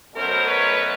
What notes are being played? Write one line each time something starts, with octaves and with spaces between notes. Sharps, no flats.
B2 F#3 A3 C#4 A#4 C5
B4 C#5